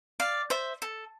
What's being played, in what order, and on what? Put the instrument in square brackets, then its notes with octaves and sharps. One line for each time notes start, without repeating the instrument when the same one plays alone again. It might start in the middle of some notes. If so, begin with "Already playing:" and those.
[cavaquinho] D5 F5
C5 E5
A4